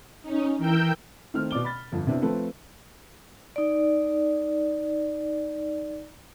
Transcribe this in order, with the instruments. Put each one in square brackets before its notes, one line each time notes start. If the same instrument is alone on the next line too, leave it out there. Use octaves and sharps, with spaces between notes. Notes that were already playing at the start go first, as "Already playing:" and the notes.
[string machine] C#4 D#4
E3 A#4 G5 E6 G6
[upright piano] D#3 A3 C4 F6
B2 D5 D6 G7
B5 A6
G1 F2
C3 B3 C4 D4 E4
F3 A3 C4 A4 B4
[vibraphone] D#4 D5